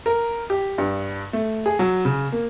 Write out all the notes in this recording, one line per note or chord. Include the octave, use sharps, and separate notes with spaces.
A#4
G4
G2
A3
G#4
F#3
C#3
A#3